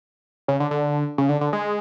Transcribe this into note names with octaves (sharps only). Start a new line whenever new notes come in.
C#3
D3
D3
C#3
D3
D3
G#3